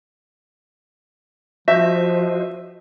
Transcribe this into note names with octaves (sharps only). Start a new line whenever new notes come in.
F3 F#4 C5 D#5 E5